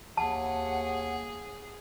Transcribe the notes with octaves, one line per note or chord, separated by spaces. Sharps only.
D#2 G#4 F#5 A5